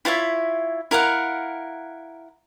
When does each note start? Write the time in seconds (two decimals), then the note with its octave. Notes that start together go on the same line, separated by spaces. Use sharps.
0.05 E4 F4 C#5 E5
0.91 E4 A#4 F5 F#5